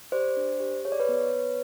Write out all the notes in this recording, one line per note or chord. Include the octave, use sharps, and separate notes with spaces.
G4 C5 D5
D4
G4
G#4 C#5
D5
B4 C#5
B3
B3